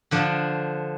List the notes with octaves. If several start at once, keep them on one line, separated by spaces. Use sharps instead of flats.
D3 F3 D4